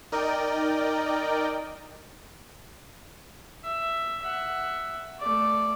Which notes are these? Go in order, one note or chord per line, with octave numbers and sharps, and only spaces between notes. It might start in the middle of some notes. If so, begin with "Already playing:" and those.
D#4 A#4 D5 D#5 G5
E5
E5 F#5
A3 D5